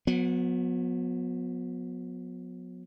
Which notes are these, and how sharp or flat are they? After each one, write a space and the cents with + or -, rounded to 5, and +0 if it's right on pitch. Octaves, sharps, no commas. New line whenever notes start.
F#3 -35 B3 +0